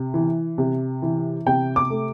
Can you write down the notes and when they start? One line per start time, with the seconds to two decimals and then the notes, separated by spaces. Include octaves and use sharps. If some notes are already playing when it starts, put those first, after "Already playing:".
Already playing: C3
0.14 E3
0.58 C3
1.02 E3
1.46 C3 G5
1.76 D6
1.90 A3